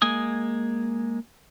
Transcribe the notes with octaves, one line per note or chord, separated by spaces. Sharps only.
G#3 A#3 G#5 D#6